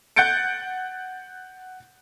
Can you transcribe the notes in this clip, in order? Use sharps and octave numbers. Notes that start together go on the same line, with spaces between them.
F#5 F#6 G6 A6 C#7 D7